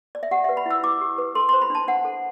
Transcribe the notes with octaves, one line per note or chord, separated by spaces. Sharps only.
D5
E5
G4 F#5
B4 E5
B5
E4 E6
E4 D6
G4
B4
A4 C6
C5 C6
B5
D4 A5
D4 F#5
A4